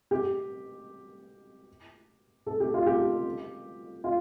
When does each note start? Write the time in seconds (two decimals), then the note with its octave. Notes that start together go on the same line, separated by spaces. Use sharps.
0.11 G4
2.46 A4
2.60 G4
2.74 F4
2.86 G4
4.04 F4